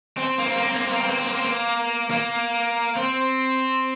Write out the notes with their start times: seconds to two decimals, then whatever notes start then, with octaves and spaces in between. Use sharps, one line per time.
0.17 C4
0.38 A#3
0.48 C4
0.57 A#3
0.65 C4
0.74 A#3
0.83 C4
0.92 A#3
1.01 C4
1.09 A#3
1.18 C4
1.27 A#3
1.36 C4
1.45 A#3
2.10 A#3
2.97 C4